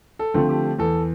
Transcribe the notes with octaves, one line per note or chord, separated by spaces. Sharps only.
A4
D3 F3 A3 C4
G4
E2 A4